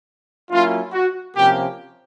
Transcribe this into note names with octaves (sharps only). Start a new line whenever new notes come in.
F#3 A#3 C#4 E4 F4
F#4
C3 F3 A#3 C#4 G4